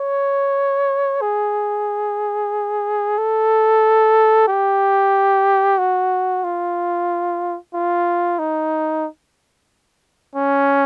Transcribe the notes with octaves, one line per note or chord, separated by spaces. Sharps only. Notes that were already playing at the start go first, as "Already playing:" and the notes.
Already playing: C#5
G#4
A4
G4
F#4
F4
F4
D#4
C#4